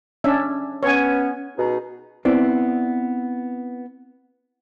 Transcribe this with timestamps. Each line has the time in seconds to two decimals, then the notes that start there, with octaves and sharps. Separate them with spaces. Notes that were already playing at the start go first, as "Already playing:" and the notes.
0.24 C#4 D4 E5
0.83 B3 C#4 C#5 G#5
1.57 B2 D#4 G#4
2.25 B3 C4 E4 D5